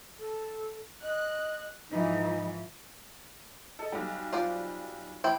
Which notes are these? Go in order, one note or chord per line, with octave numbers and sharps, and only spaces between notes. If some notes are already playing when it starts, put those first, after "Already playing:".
A4
D#5 F#6
G#2 E3 F3 D#4
A4 D#5
B1 G3
F4 C5 D5
A1 E4 C5 G5